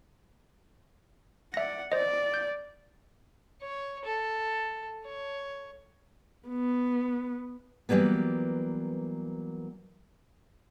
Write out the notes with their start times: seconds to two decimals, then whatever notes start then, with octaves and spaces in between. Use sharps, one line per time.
1.54 D5 E5 F#5 A#6
1.92 C5 D5 D#5
2.34 G6
3.61 C#5
4.04 A4
5.05 C#5
6.49 B3
7.89 E3 F#3 G3 A#3 B3